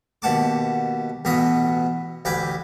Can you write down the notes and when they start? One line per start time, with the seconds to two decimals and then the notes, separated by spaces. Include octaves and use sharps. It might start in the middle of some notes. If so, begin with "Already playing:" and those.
0.22 D#2 B2 F#5 A5 D6
1.25 A1 B2 E3 B3 D#5 D#6
2.25 A1 D2 B4 G5 G#5 D6